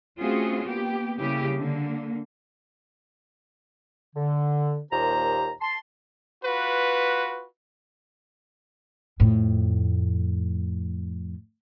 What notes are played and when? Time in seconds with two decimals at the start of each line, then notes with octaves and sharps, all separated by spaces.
0.19 A3 C4 C#4 F4 F#4 G#4
0.66 A#3 B3 G4
1.19 C#3 G3 A#3 E4 G4
1.59 D3 A#3
4.15 D3
4.92 D#2 A#2 G4 C5 A#5
5.61 A5 C6
6.44 F4 F#4 B4
9.20 F2 A2